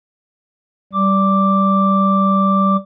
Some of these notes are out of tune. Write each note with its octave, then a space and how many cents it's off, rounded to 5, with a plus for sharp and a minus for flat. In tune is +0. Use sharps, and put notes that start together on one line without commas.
G3 -15 D6 +0